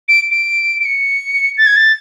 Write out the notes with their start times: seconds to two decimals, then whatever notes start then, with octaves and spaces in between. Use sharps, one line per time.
0.09 D7
0.31 D7
0.80 D7
0.85 C#7
1.58 A6
1.66 G#6
1.76 A6